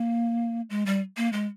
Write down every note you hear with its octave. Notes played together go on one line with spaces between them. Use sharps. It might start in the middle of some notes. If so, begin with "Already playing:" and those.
Already playing: A#3
G#3
G3
A#3
G#3